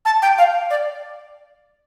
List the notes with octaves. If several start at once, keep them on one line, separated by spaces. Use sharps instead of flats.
A5
G5
F5
D5